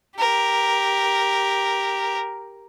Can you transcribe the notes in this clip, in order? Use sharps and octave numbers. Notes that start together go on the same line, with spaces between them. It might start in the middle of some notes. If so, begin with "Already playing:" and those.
G4 A#4